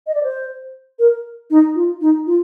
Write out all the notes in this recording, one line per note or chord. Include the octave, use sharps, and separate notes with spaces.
D#5
D5
C5
A#4
D#4
F4
D#4
F4